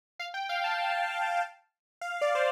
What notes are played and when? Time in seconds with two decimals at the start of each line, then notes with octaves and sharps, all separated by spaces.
0.20 F5
0.34 G5
0.49 F5
0.64 A5
2.01 F5
2.21 D5
2.35 C5